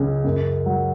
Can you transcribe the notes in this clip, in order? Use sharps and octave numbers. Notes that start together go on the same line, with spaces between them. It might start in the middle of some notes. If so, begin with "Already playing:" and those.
Already playing: C#2 C#3 F#3 C#4
F#2
F#3